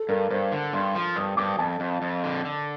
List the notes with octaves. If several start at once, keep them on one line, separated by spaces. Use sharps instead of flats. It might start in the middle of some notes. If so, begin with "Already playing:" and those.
Already playing: A4
G2 A#4
G2 C5
D3
G2 C6
F3
G2 D#6
G2 D6
F2 A5
F2
F2
D3
D3